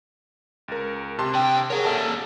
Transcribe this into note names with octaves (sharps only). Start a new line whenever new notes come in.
C#2 A#4
C3 A5 C6
D3 G5
G#4 A#4 C#5 F#5
G3 A#3 A4 E5 A5